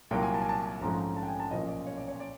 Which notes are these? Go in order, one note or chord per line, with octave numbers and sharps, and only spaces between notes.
C2 A#2 F#3 A#3 G5
G#5
A5
G#5
A5
A#1 G#2 F3 A3 C#4 A#5
A#5
A5
G5
G#5
A5
B1 A#2 F3 A#3 C#4 D#5
D#5
D5
C#5
D5
C#5
D5